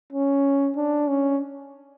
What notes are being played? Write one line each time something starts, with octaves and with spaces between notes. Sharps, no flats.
C#4
D4
C#4